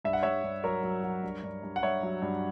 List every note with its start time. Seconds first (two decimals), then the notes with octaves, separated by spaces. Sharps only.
0.04 G2 E5
0.13 F#5
0.23 G2 C#5 E5
0.44 G2
0.64 F#3 A#4 C#5
0.83 F#3
1.03 F#3
1.23 G2
1.43 G2
1.63 G2
1.76 F#5
1.82 G2 C#5 E5
2.03 F#3
2.22 G2